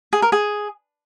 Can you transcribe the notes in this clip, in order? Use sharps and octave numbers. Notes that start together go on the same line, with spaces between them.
G#4
A#4
G#4